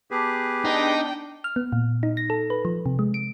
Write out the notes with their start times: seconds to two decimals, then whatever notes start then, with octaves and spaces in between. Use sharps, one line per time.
0.11 B3 G4 G#4 B4 A5 D6
0.65 D4 D#4 G5
1.44 F6
1.56 B3
1.72 A#2
2.03 D#4
2.17 A#6
2.30 A4
2.50 B4
2.65 F3
2.86 C3
2.99 G#3
3.14 D7